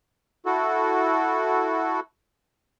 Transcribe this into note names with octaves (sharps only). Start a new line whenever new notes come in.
E4 F#4 A4